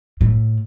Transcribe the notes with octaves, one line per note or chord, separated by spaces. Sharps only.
A2